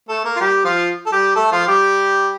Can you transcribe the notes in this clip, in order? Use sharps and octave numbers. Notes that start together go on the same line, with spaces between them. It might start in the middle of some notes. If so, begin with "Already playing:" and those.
A3 A4
A#3 A#4
F4
G3 G4
F3 F4
A4
G3 G4
A3 A4
F3 F4
G3 G4